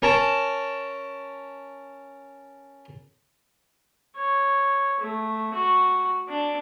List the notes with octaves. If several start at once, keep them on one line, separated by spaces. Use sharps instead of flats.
C#4 A#4 A5
C#5
A3
F#4
D4